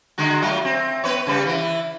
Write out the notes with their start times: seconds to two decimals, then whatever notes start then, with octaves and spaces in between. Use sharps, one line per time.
0.18 D3 G#3 F#4
0.42 F#3 A3 F4
0.65 C4
1.04 B3 B4 C#5
1.27 C#3 G3 B4
1.46 E3 E4